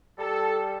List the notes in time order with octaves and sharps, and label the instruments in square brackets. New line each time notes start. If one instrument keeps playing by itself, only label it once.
[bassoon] G3 [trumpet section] A4